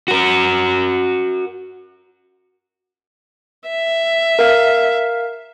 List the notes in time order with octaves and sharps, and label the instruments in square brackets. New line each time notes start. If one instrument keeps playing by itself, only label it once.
[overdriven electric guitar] F#4 A#4
[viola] E5
[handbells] A#4 F5